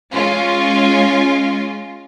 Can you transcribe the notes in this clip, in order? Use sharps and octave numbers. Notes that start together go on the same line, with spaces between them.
G#3 C#4 F4